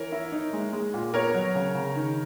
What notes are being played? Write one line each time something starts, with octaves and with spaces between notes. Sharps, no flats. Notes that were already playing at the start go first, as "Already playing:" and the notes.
Already playing: E3 A#4 C#5
E4
D#4
G#3
G#3
A#2
B3 A#4 C#5
F#3
C#3
C#3
D#3